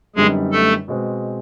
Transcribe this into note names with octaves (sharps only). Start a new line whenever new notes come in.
F#2 D3 G3 G#3 B3 D#4 G#4
A3 A4
B2 G#3 C4